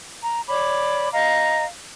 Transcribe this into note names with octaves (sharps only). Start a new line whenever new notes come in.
A#5
C#5 D5 B5 D6
D#5 F5 A#5